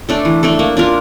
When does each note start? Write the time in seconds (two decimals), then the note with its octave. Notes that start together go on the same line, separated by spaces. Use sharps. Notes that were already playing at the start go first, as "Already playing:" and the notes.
0.09 A3 D4 A4
0.25 E3
0.43 A3 D4 A4
0.59 A#3
0.77 D4 F4 A#4